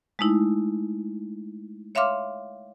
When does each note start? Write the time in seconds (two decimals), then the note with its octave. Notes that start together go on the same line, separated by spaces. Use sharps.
0.19 G#3 A3 D#4 E4
1.95 C#5 E5 F5 C6 D6 F6